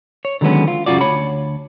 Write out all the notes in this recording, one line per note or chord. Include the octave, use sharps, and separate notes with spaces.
C#5
D3 D#3 F#3 G#3 B3 C#4
F4
F#2 C#3 G3 F4 F#4 D5
D2 C#5 B5